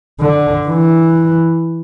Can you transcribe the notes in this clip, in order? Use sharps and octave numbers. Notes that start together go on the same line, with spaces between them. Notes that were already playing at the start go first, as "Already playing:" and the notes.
D3
E3